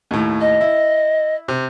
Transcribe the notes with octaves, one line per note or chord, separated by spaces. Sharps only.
D#2 A2
D#5
E4
C3